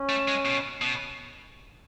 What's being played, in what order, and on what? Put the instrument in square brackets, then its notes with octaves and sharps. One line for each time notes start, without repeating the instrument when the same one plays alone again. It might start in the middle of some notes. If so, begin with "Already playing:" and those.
Already playing: [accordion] C#4
[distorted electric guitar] A3
G#3
B2
B2